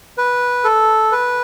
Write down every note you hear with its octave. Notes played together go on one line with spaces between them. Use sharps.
B4
A4
B4